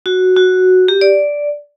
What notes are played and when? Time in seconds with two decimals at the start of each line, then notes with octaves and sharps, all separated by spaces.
0.06 F#4
0.36 F#4
0.88 G4
1.01 D5